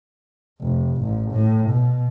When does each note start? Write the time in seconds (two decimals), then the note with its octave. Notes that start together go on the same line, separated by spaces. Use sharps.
0.60 F1
1.01 A1
1.32 A2
1.69 B2